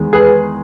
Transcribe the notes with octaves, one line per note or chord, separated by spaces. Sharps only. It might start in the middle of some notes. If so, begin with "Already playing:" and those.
Already playing: E2 D#3 G#3
G#4 B4